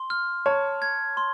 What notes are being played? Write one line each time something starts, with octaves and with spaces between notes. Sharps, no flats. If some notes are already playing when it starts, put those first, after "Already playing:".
Already playing: C6
F6
C#5 A5
G#6
C6